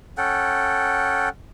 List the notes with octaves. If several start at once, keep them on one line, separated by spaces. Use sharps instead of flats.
C#4 A4 F#5 G5